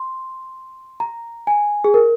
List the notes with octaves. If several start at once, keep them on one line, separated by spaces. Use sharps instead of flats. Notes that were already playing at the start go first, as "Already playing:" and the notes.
Already playing: C6
A#5
G#5
G#4
A#4